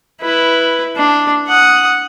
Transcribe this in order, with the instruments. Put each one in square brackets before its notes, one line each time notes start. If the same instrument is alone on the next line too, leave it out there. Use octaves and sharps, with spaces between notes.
[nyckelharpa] E4 B4
D4
F#5 D#6